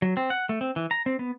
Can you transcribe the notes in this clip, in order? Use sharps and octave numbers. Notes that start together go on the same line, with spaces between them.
F#3
C4
F#5
A3
C4
E3
A#5
C4
B3